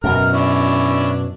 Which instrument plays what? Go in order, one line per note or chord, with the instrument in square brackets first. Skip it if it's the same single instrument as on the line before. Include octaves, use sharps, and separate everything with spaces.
[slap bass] F#2 B2 [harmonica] A#4 F6
[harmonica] C#4 D4 E4